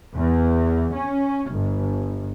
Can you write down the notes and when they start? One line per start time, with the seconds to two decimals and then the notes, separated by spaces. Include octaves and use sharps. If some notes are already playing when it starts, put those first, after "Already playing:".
0.14 E2
0.95 C#4
1.51 G1